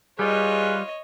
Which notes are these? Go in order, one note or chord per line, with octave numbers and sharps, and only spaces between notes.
G3 F4 G#4 B4 C#5 D#5